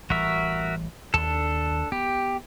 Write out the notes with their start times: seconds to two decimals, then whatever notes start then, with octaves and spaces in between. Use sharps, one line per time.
0.10 A1 E3 G3 F#4 A#4 E5
1.14 D#2 D4 A4
1.92 B3 G4